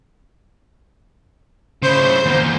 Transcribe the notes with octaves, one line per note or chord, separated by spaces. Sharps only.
C#3 E4 C5 G6
E2 A#3